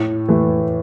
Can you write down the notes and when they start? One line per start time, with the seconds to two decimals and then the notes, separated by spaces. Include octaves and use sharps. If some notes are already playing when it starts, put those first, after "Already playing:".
Already playing: A2
0.29 E3 A3